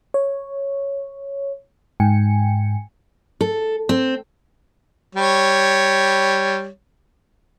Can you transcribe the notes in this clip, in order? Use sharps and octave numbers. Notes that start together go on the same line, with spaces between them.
C#5
G#2 G5 G#5 C#7
A4
C4
G3 C#5